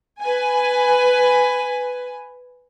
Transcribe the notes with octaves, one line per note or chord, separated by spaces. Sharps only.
B4 G#5